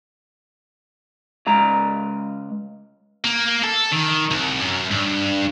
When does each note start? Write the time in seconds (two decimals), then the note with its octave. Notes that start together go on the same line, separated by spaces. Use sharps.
1.47 C#3 G#3 A#5
3.25 A#3
3.64 A4
3.92 D#3
4.31 C2
4.61 F#2
4.91 G2